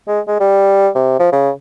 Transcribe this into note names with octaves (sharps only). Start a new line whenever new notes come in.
G#3
G#3
G3
C3
F3
C#3